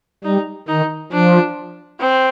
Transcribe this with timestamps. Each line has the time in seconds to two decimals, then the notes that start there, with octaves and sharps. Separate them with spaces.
0.24 G3 D#4
0.68 D#3 D#4
1.12 F3 D4
2.00 C4